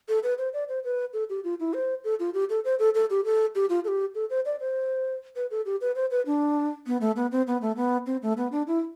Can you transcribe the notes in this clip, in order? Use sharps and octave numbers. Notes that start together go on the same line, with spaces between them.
A4
B4
C5
D5
C5
B4
A4
G4
F4
E4
C5
A4
F4
G4
A4
C5
A4
A4
G4
A4
G4
F4
A4
G4
A4
C5
D5
C5
B4
A4
G4
B4
C5
B4
D4
B3
A3
B3
C4
B3
A3
B3
C4
A3
B3
D4
E4